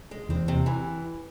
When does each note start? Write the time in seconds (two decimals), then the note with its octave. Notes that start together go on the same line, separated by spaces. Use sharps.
0.11 G#3
0.29 E2 E3 C4
0.48 C3
0.66 E3